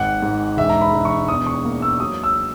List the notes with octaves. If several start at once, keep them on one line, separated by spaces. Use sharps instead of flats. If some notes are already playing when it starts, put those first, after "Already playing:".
Already playing: G#1 F#5
G#2
E1 E5
A#5
B5
E1
C#6
E2 D#6
C#6
A#3
E6
F#3 D#6
E6